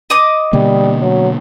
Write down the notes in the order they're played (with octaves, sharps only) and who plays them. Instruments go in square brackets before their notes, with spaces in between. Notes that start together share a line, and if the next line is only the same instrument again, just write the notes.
[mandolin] D#5 D6 D#6
[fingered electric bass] B2 D3 A#3 [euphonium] G3
[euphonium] F#3